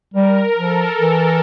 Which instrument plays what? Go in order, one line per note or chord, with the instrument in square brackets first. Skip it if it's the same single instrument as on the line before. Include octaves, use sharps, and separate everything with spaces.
[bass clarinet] G3 [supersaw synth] A#4
[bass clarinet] F3 [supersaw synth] A4
[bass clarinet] E3 [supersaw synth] A#4